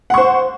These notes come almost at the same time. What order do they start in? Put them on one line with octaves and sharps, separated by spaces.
F#5 C#6 C5